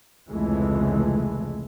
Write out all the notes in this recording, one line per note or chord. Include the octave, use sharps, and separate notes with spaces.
F1 C#2 E3 G#3 A3